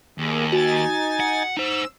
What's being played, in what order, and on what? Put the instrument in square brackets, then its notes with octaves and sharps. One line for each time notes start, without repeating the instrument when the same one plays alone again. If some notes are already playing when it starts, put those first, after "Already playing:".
[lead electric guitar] D#2 [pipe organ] A#3 G#4
[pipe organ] D#4 G#5 A6 [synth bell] F#4
[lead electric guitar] F#5
[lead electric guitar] D#4 C5 [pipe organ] E6